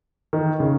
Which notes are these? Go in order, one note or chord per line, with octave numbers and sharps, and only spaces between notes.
D#3
C#3